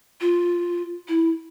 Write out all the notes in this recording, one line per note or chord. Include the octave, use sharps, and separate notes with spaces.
F4
E4